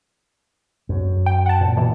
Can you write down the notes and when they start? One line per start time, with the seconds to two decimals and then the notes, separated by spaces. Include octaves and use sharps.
0.89 F#2
1.26 G5
1.46 F#5 A5
1.61 A#2
1.77 B2 E3